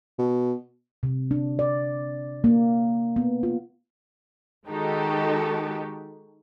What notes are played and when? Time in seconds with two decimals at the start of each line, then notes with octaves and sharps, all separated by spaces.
0.18 B2
1.03 C3
1.31 D4
1.59 D5
2.44 A#3
3.16 B3
3.43 F4
4.67 D#3 G#3 D#4 F#4 G4 A4